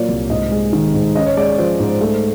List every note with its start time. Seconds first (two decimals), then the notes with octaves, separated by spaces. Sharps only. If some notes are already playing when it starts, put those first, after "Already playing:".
Already playing: A#2 F#3 A#3 C#5 D5
0.08 C2
0.30 G#2 D#5
0.52 G#3
0.73 D#3
0.94 G#2
1.15 C#4 D#5
1.26 C#5
1.37 G#3 D5
1.48 C#5
1.58 F3 C5
1.80 G#2
2.01 A3